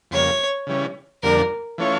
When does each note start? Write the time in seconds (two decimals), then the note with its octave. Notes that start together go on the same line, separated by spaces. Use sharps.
0.11 F2 C#3 G3 A#3 C#5
0.67 C#3 E3 G3 C#4
1.23 F2 D3 G3 A#3 D4 A#4
1.78 E3 A3 C#4 F4 C#5